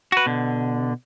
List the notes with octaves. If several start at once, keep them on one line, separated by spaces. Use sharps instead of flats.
F#4 B4
B2 D3